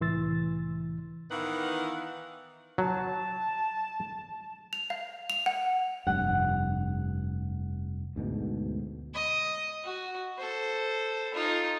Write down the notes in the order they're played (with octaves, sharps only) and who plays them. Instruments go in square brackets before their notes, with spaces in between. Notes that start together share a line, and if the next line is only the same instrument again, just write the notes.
[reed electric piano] C2 A2 E3 C6 E6 A6
[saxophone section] D#3 E3 B3 F5 F#5
[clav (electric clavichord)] F#3 [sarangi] A5
[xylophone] F7
F5
F7
F#5
[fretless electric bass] F1 G2 [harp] F#5
[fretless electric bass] D2 G#2 B2
[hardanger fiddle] D#5
F#4
A4 C5
D#4 F4